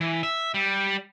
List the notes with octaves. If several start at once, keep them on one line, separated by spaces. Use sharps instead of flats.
E3
E5
G3